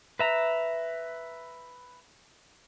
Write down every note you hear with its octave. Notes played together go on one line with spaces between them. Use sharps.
B4 E5 A#5